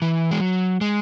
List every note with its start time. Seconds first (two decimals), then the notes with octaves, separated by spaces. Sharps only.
0.02 E3
0.31 G#3
0.41 F#3
0.81 G#3